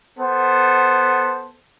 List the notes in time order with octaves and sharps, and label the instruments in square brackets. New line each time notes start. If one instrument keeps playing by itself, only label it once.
[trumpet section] B3 A4 C5